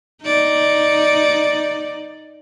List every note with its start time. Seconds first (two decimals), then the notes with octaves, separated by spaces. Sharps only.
0.23 D#4 D5